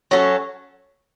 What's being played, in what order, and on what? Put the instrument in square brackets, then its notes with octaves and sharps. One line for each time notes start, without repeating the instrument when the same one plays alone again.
[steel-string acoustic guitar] F#3 C#4 F#4 A4